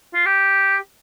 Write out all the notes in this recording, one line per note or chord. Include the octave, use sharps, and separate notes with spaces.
F4
G4